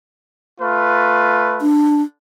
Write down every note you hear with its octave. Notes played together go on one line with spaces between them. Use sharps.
A3 F4 B4
D4